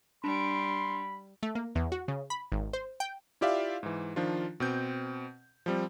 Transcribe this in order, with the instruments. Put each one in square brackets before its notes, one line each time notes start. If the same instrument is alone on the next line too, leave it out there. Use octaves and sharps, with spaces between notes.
[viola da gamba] G3 [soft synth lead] D4 [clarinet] B5 [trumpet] C6
[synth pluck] A3
A#3
E2
F#4
C#3
B5
G#1
C5
G5
[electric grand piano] E4 F4 G4 D5 E5 F5
G#2 E3
D#3 F3 D4 F4
B2 C4 G6
F3 G3 C4